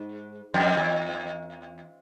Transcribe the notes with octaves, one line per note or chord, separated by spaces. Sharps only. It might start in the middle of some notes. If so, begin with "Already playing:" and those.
Already playing: G#2
F2
E2